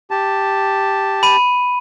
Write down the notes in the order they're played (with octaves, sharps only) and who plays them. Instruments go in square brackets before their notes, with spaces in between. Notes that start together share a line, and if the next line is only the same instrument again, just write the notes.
[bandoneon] G4 A5
[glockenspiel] B5 D#7